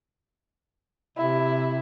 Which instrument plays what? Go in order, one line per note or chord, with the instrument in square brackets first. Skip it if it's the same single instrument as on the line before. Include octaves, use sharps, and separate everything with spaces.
[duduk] C3 [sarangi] E4